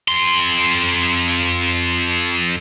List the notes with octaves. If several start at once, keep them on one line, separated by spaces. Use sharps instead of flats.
F2 C6